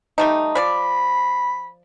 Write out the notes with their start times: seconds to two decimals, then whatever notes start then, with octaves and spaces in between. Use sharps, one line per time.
0.18 G3 A3 D#4
0.55 F3 D5 B5